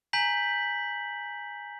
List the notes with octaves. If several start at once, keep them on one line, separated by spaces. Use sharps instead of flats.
G#5 A#5 G6 B6 F#7